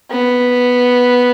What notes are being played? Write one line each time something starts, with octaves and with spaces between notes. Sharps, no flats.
B3